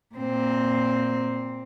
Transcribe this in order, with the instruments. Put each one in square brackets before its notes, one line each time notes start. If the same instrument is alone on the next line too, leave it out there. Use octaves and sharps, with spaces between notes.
[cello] A#2 C4